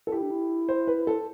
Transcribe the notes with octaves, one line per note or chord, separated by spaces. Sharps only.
A4
E4 G4
D4
E4
C5
B4
A4